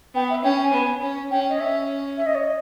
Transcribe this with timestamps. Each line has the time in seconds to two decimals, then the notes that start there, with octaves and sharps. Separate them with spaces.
0.14 B3 G5
0.30 E5
0.44 C#4 G5
0.63 G#5
0.73 B3
1.02 C#4
1.31 C#4 G5
1.49 D#5
1.59 C#4 E5
2.18 E5
2.26 D#5
2.35 C#5
2.44 D#5